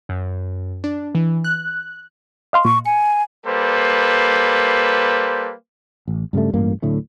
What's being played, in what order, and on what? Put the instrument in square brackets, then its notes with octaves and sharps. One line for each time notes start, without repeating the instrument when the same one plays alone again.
[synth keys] F#2
D4
E3
F#6
[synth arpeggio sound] D#5 F5 C6
[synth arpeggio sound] A#2 [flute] C#6
[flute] G#5 [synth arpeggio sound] C#7
[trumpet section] G3 A#3 A4 B4 C5
[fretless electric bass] A1
G2 C#3 G3 A3
A1 G2 A#3
D1 A2 D3 A3